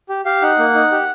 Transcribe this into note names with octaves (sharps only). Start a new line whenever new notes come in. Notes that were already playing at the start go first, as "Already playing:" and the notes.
G4
G4 F5
D#4 F#5
A#3
D#4
G4